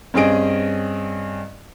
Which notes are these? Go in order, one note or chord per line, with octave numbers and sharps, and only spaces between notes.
G2 C4 C#4 G#4 D#5 D7